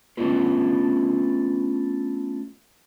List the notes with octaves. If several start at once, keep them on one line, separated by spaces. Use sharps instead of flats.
A3 B3 C#4 D4 F4 B4